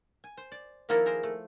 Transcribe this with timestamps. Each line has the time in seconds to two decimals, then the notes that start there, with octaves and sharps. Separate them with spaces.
0.24 G#5
0.37 C5
0.52 D5
0.89 D#3 F3 A#3 E4 A4 A#4
1.06 G#4 A#4 C5
1.23 A3